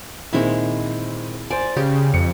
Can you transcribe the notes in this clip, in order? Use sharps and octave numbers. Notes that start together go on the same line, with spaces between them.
A#2 D#3 G#3 C4 E4
C5 D5 G#5
C#3 G4
F2 C#7